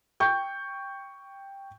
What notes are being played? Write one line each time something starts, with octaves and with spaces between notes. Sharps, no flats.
G5 C#6 G6